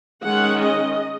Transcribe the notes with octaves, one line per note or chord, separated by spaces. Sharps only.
D#3 G#3 C#4 F#5
D#5